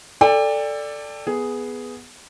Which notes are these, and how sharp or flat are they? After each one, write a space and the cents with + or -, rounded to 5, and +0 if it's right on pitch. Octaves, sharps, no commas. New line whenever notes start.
A4 +10 D5 +0 G5 +35
B3 +0 G#4 +0